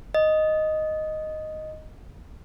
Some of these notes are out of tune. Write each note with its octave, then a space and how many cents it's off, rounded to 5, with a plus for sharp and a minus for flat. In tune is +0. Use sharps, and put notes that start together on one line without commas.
D#5 +0